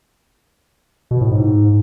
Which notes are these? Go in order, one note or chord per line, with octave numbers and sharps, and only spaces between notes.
B2
A2
G#2